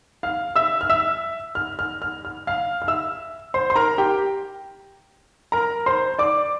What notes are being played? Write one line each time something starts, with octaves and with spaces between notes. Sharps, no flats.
F5 F6
E5 E6
F6
E5 E6
F6
F6
F6
F6
F5 F6
F6
E5 E6
C5 C6
C6
A#4 A#5
G4 G5
A#4 A#5
C5 C6
D5 D6